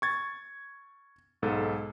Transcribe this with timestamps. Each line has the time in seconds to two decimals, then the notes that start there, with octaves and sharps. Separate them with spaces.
0.02 C#6 G#6 A6
1.42 B1 G#2 A4